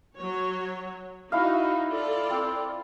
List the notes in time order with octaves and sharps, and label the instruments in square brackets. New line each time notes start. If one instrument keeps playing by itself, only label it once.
[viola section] F#3 C#5
[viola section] D#4 F#4 [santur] E4 F5
[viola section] F4 A4 D5
[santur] C4